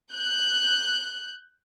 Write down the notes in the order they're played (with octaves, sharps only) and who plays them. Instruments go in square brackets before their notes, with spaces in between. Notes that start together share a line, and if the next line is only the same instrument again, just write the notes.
[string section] F#6 G6